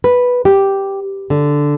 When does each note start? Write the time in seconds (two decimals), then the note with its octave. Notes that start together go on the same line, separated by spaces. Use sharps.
0.04 B4
0.45 G4
1.30 D3